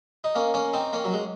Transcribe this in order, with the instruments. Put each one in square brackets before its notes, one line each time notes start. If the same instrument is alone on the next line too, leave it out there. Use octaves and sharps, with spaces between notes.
[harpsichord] D#4
A#3 C#4
A#3 C#4
C4 D#4
A#3 C#4
F#3
G#3